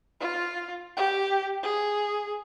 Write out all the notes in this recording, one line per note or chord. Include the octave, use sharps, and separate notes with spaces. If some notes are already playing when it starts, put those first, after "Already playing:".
F4
G4
G#4